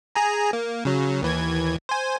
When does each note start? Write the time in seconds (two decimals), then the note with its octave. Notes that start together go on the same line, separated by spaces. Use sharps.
0.15 G#4 G#5 A#5
0.53 A#3
0.85 C#3 F#3
1.22 D#2 E3 G#6
1.89 C5 G#5